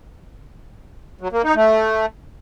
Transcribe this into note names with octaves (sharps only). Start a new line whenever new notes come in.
F#3
A#3
D#4
A3